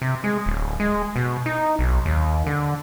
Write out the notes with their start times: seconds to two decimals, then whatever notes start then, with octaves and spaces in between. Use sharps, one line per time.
0.02 C3
0.24 G#3
0.46 D1
0.80 G#3
1.16 B2
1.46 D#4
1.79 B1
2.05 D#2
2.46 D3